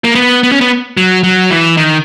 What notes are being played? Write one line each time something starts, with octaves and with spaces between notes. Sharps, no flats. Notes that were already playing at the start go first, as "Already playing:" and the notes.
A#3
B3
B3
C#4
B3
F#3
F#3
E3
D#3